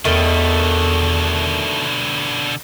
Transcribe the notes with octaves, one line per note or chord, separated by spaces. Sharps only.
E2 B2 D3 D#3 A3